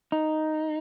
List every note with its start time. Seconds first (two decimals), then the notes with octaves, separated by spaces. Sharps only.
0.12 D#4